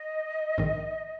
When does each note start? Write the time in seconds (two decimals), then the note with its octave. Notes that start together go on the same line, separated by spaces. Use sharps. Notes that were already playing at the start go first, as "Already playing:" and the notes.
Already playing: D#5
0.58 A#1 G#2 D#3